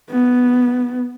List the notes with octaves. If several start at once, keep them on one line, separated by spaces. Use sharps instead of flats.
B3